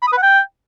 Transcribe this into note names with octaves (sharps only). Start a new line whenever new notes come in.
B5
D#6
B4
F#5
G5